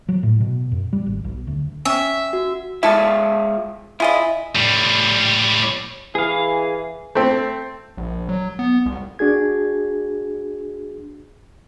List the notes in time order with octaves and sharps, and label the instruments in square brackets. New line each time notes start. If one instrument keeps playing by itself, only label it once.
[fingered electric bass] F#3
A2
B2
F#2
G3
G#1
B1
D2
[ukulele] C#4 G5 G#5 [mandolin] E5
[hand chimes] F#4
[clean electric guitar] G#3 F4 E5 [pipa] E4 A4 A5
[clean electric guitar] E4 [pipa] F4 G#4 D#5
[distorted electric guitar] A2 G3
[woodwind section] E3 [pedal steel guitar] G#4 F5
[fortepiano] A3 C4
[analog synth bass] A#1
F#3
B3
C2
[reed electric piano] D4 F#4 G#4 G#6